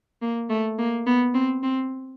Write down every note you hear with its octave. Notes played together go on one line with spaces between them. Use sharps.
A#3
A3
A#3
B3
C4
C4